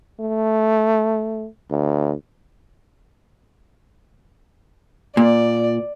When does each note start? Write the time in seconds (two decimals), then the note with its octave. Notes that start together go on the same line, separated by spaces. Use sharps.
0.20 A3
1.71 D2
5.17 A#2 D5